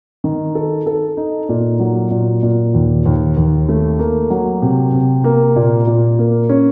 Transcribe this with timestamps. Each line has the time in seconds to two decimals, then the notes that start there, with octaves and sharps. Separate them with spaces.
0.24 D#3
0.55 A4
0.86 A4
1.17 D#4
1.49 A#2
1.80 F#3
2.11 A#2
2.43 A#2
2.74 D#2
3.06 D#2
3.37 D#2
3.69 A3
3.99 A#3
4.30 F#3
4.62 C3
4.93 C3
5.24 A#3
5.56 A#2
5.87 A#2
6.19 A#3
6.49 C#4